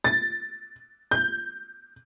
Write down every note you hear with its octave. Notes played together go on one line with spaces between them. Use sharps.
A6
G6